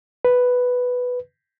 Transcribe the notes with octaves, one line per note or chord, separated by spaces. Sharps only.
B4